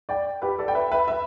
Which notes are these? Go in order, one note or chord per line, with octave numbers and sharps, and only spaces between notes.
D5 G5
G4 B4
A4 D5
G5
B4 E5
B4 E5
B4 E5